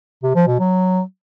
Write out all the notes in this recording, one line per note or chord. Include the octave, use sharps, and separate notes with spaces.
C3
F3
B2
F#3